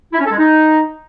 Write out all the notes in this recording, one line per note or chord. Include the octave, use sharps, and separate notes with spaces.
E4
C#4
A4
G#3
D#4